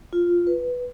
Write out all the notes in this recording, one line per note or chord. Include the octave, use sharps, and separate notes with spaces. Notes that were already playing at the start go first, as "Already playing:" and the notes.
F4
B4